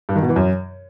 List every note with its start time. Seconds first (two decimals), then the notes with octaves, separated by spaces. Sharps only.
0.09 G2
0.16 D#3
0.22 B2
0.29 E3
0.36 F#2